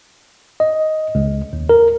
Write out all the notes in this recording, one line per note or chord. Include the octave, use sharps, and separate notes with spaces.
D#5
C#2
D#2
A#4